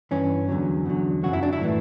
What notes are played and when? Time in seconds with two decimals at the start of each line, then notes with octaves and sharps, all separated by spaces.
0.11 G2 E3 C#4
0.49 E2 D3 F#3
0.86 E2 D3 F#3
1.23 F#2 C#3 F#3 F#4
1.33 E4
1.43 D4
1.53 E4
1.62 A2 E3